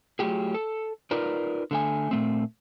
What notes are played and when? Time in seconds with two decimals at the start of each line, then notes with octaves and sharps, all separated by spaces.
0.19 F#3 A3 F4 G4 G#4
0.54 A4
1.11 D#4 F4 A#4 B4 D5
1.71 D3 A3 G#5
2.11 A#2 A3 C4